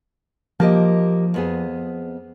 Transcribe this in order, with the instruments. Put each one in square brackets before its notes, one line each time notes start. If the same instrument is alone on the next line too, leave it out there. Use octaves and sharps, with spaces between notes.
[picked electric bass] F3 [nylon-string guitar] A#3 G4 D#5
[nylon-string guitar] F2 B3 G#4